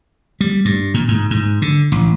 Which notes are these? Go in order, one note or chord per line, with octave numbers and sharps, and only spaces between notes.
G3
G2
A#2
G#2
G#2
D3
A1